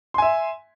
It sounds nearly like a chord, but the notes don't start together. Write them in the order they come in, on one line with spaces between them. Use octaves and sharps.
C6 G#5 E5